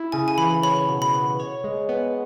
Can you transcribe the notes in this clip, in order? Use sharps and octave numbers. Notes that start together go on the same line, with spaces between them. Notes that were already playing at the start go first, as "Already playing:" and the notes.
Already playing: E4
C#3 G#5
G#5
E3 B5
C#5 B5
B2
B5
B3
C#5
G#3
B3